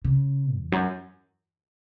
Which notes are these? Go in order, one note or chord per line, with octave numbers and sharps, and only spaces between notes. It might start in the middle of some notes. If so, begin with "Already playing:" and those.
C#3
E2
F#2